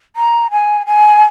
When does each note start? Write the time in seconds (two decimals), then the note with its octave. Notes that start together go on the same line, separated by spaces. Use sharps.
0.16 A#5
0.51 G#5
0.86 G#5